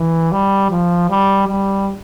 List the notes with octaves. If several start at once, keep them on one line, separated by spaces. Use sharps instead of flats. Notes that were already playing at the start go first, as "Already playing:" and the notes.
Already playing: E3
G3
F3
G3
G3